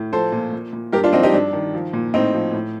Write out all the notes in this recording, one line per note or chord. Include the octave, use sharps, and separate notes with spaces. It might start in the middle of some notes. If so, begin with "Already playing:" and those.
Already playing: A2
F3 A4 C5
A#2
A#2
A#2
G2 G4 A#4
D4 F4
F3 C4 D#4
D#4 G4
G2 D4
D#3
F3
A#2
A2 C4 D#4
F3
A2